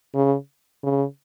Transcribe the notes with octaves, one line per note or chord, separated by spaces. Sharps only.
C#3
C#3